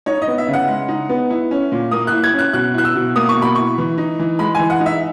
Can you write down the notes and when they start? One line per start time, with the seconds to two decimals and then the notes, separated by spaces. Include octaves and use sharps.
0.06 D#4 C#5
0.22 D#5
0.28 B3
0.38 E5
0.48 C#3
0.53 F#5
0.68 G#3
0.88 D#4
1.09 B3
1.30 E4
1.51 C#4
1.72 A#2
1.91 A#3 D#6
2.07 E4 F#6
2.24 G#6
2.33 C#4
2.39 F#6
2.53 B2 F#6
2.74 E4 F#6
2.85 E6
2.95 B2
3.16 A#3 D#6
3.29 C#6
3.36 B2
3.42 B5
3.55 E4 C#6
3.78 E3
3.98 D#4
4.19 E3
4.39 G#3 B5
4.55 E3 G#5
4.70 F#5
4.80 D#4
4.86 E5